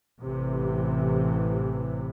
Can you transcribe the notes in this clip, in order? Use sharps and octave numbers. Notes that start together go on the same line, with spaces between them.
A1 C3 E3